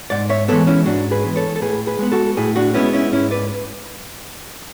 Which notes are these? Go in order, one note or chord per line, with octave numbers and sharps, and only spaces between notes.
G#2 D5 F#5
C#5 E5
E3 G#3 B3 A4 C#5
C#4 E4
G#2 D4 F#4
G#4 B4
E3 G#3 B3
A4 C#5
A4
A2 G#4 B4
G#4 B4
G#3 B3
F#4 A4
A2 E4 G#4
D4 F#4
G#3 B3 C#4 E4
C#4 E4
G#2 C#4 E4
B4 D5